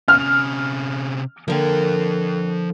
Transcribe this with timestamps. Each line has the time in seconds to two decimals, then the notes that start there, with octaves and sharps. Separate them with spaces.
0.08 C3 C#4 F6
1.48 D3 F3 A#3 G5